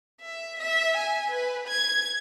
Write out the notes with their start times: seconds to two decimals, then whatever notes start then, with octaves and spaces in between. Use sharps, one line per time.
0.21 E5
0.60 E5
0.97 G#5
1.31 B4
1.68 G#6